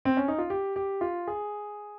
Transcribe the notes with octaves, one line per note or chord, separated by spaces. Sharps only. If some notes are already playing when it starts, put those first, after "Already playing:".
C4
C#4
D#4
F4
G4
G4
F4
G#4